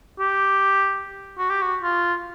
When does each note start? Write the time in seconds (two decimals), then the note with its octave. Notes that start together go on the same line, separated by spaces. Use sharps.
0.19 G4
1.38 F#4
1.50 G4
1.62 F#4
1.82 F4